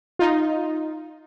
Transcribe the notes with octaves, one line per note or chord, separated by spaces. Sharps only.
D#4 F4